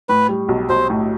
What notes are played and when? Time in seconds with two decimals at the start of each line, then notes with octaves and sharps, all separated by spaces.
0.09 A2 B4
0.29 G3
0.49 B1
0.69 B1 C5
0.90 A2